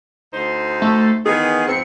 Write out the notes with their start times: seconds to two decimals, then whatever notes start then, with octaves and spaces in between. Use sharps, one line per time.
0.33 D2 D#4 C5
0.82 A3
1.26 D#3 E3 B3 G#4
1.68 F2 G#2 C4 C#7